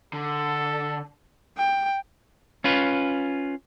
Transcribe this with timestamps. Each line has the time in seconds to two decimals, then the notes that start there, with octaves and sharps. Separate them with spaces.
0.13 D3 A4
1.57 G5
2.64 C#4 F4 B4